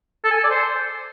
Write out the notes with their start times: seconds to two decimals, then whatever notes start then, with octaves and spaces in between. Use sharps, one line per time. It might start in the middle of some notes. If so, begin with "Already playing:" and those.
0.24 A4
0.31 G#5
0.37 A4
0.44 D5
0.50 C5